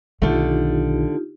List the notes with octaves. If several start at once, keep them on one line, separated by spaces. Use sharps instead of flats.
B1 D3 D#3 A3 D#4 F4 G4